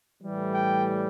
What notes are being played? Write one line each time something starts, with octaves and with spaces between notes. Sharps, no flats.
A2 E3 G3
G5